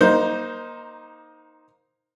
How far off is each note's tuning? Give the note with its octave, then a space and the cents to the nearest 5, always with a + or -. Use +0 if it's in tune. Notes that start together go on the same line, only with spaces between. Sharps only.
A#3 +25 D#4 +0 C5 +0